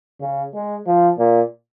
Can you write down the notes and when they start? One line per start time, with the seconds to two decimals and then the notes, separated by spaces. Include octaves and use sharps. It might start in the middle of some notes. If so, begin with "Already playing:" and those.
0.21 C#3
0.53 G#3
0.86 F3
1.18 A#2